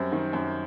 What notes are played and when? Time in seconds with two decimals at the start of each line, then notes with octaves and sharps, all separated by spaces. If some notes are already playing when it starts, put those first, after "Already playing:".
Already playing: F#2 G3 C4
0.12 D#3
0.33 F#2